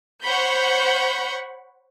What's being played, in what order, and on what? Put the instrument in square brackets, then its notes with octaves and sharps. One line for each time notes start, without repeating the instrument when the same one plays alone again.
[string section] C5 C#5 F#5 B5 C#6 G6